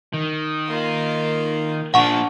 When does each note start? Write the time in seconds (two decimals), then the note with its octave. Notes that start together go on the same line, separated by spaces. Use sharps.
0.14 D#3
0.68 A#3 F4
1.94 A#2 F3 D4 F#5 C#6